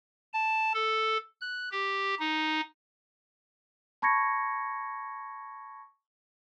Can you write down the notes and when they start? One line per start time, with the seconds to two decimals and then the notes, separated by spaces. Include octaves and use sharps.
0.33 A5
0.74 A4
1.41 F#6
1.71 G4
2.20 D#4
4.02 A5 B5 C#6 G#6 A#6 C#7